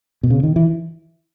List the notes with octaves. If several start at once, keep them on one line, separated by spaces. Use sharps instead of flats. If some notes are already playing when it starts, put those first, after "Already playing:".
B2
C#3
D#3
E3